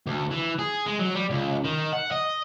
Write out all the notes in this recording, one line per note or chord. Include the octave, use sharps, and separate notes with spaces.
D2
E3
G#4
G#3
F#3
G3
C#2
D#3
F#5
D#5